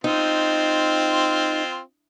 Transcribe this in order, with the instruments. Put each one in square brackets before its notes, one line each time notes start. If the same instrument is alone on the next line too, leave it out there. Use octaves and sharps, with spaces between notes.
[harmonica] C4 F4 [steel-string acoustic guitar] D#4